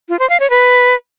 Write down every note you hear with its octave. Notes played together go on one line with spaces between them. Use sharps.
F4
C5
F5
C#5
B4